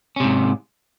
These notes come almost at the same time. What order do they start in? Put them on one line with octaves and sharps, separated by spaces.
C#4 C3 G#2